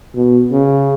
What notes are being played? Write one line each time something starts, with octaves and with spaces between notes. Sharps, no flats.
B2
C#3